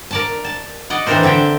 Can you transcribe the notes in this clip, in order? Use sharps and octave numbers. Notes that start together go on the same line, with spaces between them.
A#4 D5 A5
A5
D5 D#5 F#5
E3 C4 D4 A4 A#4 C5
D3 C4 E5 G5